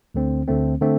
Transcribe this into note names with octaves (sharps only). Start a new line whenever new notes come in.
D2 D3 A3 C4
D2 D3 A3 C4
D3 A3 C4